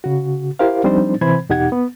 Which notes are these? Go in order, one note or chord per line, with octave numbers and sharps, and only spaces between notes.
C#3 F#4
E4 G4 A#4 C5 F5
F3 G3 C4 D4 D#4 C5
C3 E3 C4 C5 B5 G#6
E2 B2 D#4 G4 F#5 G#6
B3